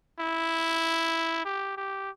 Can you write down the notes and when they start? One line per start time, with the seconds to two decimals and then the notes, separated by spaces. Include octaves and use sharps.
0.20 E4
1.45 G4
1.77 G4